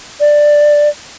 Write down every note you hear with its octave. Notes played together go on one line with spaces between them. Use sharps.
D5